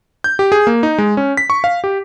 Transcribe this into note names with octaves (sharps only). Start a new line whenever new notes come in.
G6
G4
G#4
A#3
D#4
G#3
C#4
B6
C#6
F5
G4